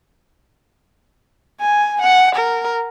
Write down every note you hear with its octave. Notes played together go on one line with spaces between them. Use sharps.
G#5
F#5
A#4